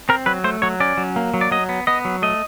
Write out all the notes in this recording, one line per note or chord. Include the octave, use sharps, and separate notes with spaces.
C4 A#4
F#3 B4
A3 C5
F#3 C#5
C#4 D5
F#3
A#3
F#3
D5
F#3 D#5
B3
B3 D#5
F#3
A3 D#5